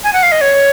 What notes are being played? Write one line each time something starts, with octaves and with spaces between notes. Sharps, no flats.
G#5
F#5
F5
D#5
C#5